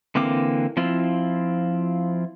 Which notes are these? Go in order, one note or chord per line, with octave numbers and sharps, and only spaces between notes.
D3 E3 A#3 C4 D6
F3 C4 E4 F4